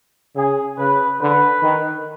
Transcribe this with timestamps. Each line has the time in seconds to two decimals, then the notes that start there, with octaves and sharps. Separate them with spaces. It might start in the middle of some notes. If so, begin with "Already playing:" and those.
0.35 C#3 G#4
0.78 C#3 B4
1.21 D3 B4
1.63 D#3